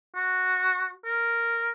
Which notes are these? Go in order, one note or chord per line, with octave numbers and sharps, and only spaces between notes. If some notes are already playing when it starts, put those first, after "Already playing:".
F#4
A#4